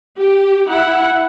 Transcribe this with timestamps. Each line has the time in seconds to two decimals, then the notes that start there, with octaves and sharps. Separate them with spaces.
0.17 G4
0.68 E4 F#5